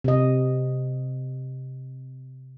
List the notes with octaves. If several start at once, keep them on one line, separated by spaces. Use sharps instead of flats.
C3 D#5